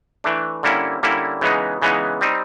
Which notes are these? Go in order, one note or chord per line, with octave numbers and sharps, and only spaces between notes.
E3 A3 D4
D3 G3 A#3 C#4 E4
D3 G3 A#3 C#4 E4
C#3 E3 G#3 B3 D#4
C#3 E3 G#3 B3 D#4
G3 C4 D#4